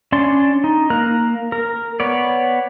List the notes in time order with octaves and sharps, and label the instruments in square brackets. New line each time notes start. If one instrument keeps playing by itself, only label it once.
[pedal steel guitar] C#4 D4 D5 C6
D#4
A#3 A#4 F#6
A#4
B3 C#5 D5